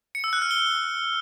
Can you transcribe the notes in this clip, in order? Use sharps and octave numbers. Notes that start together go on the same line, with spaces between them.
C#7
E6
F#6
F6
G7